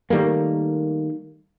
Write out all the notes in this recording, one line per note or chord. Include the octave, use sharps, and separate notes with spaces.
D#3 G3 A3 A#3